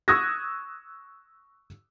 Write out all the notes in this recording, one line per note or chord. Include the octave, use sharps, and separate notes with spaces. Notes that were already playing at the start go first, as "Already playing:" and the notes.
C#6 D#6 E6 F#6 G#6 A#6